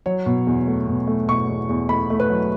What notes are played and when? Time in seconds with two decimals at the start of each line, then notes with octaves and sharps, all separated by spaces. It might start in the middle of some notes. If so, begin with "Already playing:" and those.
0.06 F#3 C#5
0.26 B2
0.47 E2
0.67 A3
0.88 B2
1.07 A3
1.29 B2 C#6
1.49 E2
1.69 E2
1.89 A3 B5
2.10 A3
2.20 B4
2.30 F#3